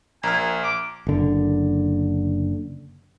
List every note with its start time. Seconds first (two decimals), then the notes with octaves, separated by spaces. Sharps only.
0.23 A#1 A#4 G#5 F6
0.63 D6
1.07 F#1 D3